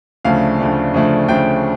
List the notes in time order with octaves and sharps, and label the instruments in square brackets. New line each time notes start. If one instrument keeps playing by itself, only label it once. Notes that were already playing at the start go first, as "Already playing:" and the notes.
[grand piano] D2 C#3 F3 A3 D4 F5
D2 C#3 F3 A3 D4
D2 C#3 F3 A3 D4
D2 C#3 F3 A3 D4 G5